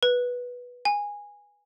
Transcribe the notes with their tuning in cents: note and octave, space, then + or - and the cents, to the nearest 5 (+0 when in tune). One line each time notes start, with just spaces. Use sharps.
B4 -10
G#5 -15